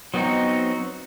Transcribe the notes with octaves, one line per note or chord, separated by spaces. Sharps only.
F#3 B3 C4 D#4 F#4